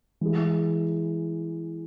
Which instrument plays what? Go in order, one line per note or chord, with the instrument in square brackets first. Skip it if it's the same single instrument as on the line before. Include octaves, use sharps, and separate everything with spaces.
[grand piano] E3 G#3 E4 G#4